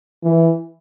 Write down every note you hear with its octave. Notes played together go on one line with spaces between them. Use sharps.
E3